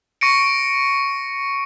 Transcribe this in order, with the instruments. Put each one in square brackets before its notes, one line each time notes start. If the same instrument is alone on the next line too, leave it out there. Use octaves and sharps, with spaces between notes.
[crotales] C#6 A#6 C#7 D7